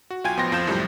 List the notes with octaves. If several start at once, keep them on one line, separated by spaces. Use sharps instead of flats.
F#4
B1 F4 G5 G#5 G#6
A1 F3 B3 G5 C6 A#6
F2 F3 F4 G6 E7
C2 F#2 A2 F3 G3